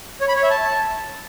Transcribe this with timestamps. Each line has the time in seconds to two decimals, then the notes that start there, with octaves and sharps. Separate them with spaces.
0.21 C#5
0.28 B5
0.36 C#5
0.43 E5
0.50 A5